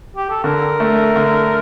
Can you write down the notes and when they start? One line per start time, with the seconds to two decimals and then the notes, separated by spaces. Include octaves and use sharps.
0.16 G4
0.30 A4
0.44 D3 A#4
0.80 A3
1.16 D3